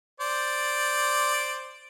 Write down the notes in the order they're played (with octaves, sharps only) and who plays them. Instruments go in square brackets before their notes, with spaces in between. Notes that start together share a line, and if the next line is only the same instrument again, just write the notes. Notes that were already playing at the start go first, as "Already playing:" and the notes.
[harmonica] C5 D5